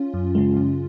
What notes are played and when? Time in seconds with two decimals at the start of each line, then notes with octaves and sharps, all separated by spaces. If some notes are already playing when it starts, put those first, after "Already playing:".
Already playing: C#4 F4
0.14 F#2
0.35 C#3 G#3
0.57 F#2